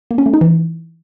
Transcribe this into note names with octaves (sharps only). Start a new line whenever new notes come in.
A#3
C#4
A3
D#4
E3